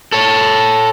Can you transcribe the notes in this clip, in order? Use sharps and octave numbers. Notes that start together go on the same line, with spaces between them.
A4 C#5